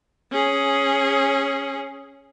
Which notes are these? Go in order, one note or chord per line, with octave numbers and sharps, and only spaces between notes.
C#4 G#4